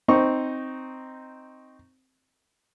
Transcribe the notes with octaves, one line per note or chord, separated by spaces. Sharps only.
C4 D#4 C#6